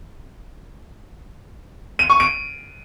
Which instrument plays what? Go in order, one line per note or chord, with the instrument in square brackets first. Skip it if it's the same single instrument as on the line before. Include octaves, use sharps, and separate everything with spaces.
[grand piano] D#7
C#6
D7